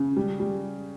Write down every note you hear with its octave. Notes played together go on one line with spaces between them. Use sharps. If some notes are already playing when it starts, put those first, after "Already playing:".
Already playing: C#3
G3
G3